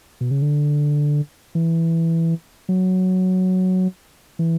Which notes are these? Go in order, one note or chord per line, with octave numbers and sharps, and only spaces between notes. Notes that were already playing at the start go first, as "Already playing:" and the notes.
B2
C#3
D3
E3
F#3
E3